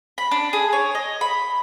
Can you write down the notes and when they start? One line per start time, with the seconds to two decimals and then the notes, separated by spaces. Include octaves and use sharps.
0.18 B5
0.31 D4
0.53 G#4
0.73 C#5
0.95 D#5
1.21 B5